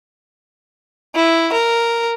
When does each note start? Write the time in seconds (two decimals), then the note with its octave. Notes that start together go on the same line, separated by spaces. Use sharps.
1.15 E4
1.53 A#4